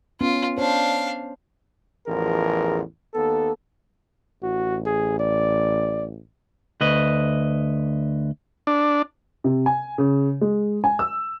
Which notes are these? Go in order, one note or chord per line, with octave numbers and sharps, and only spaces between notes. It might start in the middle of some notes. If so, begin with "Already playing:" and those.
B3 C#4 F4
D4 C5 C#5 F5
A1 E2 F3 G#4 A#4
D#2 A#3 B3 A4
A1 F#4
G#4
D5
D2 B4 D#5
D4
C3
G#5
C#3
G#3
G#5
E6